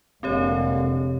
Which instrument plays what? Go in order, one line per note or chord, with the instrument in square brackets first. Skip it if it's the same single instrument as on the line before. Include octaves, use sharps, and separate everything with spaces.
[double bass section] F1 [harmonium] D3 G#3 A#3 [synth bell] C4 G4 C#5